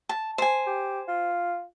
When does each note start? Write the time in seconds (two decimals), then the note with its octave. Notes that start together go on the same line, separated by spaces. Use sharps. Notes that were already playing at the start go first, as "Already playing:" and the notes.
0.09 A5
0.38 C5 G#5
0.66 G4
1.08 F4